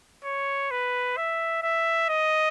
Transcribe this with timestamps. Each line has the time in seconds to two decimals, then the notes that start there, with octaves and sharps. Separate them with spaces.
0.25 C#5
0.71 B4
1.17 E5
1.63 E5
2.09 D#5